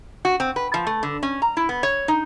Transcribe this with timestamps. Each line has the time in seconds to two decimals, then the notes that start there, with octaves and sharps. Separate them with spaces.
0.25 F#4
0.40 C4
0.56 B4
0.74 F3
0.87 A3
1.03 D3
1.23 C#4
1.42 A#5
1.57 E4
1.69 B3
1.83 C#5
2.08 D#4